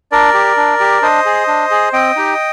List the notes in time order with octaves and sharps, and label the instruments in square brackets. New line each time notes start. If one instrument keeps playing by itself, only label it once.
[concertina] D4 A#4 D5
G4
D4
G4
D4 C5 D#5
G#4
D4
G#4
C4 D#5 G5
D#4 G4